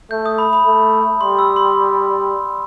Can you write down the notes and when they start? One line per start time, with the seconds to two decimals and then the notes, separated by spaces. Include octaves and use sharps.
0.11 A3 G6
0.26 D#6
0.38 B5
0.53 B5
0.66 A3
1.20 G3 C6
1.39 E6
1.56 C6